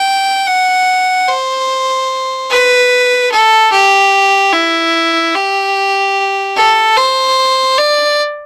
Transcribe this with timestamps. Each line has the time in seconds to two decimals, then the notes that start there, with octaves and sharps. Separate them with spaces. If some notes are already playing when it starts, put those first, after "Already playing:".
Already playing: G5
0.47 F#5
1.28 C5
2.50 B4
3.31 A4
3.72 G4
4.53 E4
5.35 G4
6.56 A4
6.97 C5
7.78 D5